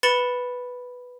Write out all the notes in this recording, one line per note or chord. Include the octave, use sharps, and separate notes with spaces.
B4 B5 A6 C#7 E7 G7